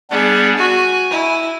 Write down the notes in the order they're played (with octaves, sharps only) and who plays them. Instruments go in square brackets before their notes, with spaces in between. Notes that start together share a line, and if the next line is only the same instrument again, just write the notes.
[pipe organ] G3 B3 D4 [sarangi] G#4
[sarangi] F#4 [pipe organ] G#5
[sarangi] E4